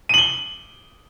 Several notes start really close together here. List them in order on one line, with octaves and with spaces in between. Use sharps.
D#7 F#7 G7